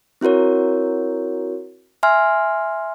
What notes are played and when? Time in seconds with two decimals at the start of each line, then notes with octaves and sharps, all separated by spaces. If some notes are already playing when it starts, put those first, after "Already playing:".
0.21 C4 E4 F#4 A#4 C#5
2.03 E5 G#5 C6 F6